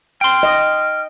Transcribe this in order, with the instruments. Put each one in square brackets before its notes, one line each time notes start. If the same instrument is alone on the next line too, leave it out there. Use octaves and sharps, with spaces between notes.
[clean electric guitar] G5 C6 [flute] F6
[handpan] D#5